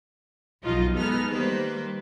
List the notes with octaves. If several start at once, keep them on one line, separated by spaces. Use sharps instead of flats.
B1 F3 D#4 F4 D#5
G#3 B3 D#4 A4 B4 F6
D#3 G3 A#3 B4 C5